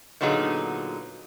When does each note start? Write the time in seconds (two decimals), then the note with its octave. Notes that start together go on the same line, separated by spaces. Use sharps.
0.21 A#2 D3 F#3 B3 D#4 G#4